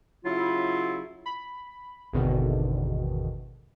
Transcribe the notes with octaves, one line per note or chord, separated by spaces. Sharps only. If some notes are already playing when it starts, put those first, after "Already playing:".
C#3 F#3 E4 F4
B5
G#1 E2 B2 D3 D#3